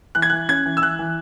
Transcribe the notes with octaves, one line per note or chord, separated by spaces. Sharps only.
E3 F#6
G#6
E3 F#6
C#4 G#6
E3
E6
E3 F#6
E3